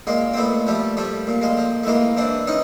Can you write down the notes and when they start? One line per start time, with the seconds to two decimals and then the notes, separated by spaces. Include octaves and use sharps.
0.07 A#2 G#3 A#3
0.34 C4
0.37 A#2 A3 B3
0.67 F3 G3 A3
0.97 F3 G3 A3
1.27 A#2
1.42 G#3 A#3
1.57 F3
1.84 A3
1.87 E3 G#3 A#3
2.17 E3 C4 D4
2.47 E3 C#4 D#4